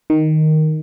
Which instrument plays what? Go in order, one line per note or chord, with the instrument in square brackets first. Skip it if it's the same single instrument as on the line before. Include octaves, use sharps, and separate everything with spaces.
[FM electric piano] D#3